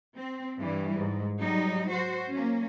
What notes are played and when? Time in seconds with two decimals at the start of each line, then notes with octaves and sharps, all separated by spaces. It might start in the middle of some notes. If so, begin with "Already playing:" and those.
0.17 C4
0.59 G2 E3 G3
0.94 G#2
1.39 G#2 F#3 G3 D#4
1.90 F#3 F#4 C5
2.30 A#3 C#4